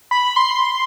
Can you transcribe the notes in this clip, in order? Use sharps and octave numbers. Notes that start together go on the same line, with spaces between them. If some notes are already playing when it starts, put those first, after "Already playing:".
B5
C6